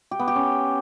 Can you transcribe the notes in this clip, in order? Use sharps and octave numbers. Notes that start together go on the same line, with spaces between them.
G4
B3
G4
C#4